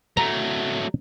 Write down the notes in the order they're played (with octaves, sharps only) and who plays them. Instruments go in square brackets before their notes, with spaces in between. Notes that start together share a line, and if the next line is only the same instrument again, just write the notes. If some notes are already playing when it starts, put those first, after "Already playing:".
[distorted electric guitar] F#3 A3 [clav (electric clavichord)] A#5